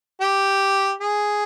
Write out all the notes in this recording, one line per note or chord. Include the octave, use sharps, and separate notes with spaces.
G4
G#4